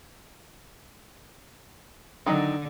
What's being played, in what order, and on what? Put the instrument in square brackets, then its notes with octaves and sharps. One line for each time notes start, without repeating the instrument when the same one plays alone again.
[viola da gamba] D3 [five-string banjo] D#3 F#3 D#4